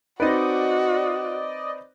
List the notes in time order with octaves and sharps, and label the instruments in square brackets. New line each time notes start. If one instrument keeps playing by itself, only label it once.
[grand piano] C4 D#4 B4 [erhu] F#4 [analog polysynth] D5 D#5